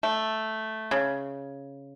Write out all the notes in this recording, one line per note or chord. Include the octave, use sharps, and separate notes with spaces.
A3
C#3